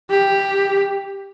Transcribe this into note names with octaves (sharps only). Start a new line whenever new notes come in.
G4